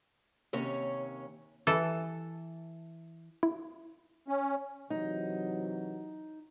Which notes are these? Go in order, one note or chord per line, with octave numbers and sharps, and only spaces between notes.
D#2 C3 C#4 C#5
E3 A4
E4
C#4
C3 E3 F#3 D#4